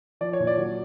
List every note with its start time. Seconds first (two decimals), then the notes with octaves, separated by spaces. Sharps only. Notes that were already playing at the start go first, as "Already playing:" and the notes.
0.21 F3 D5
0.33 C#5
0.40 A#2
0.47 D5
0.58 F#3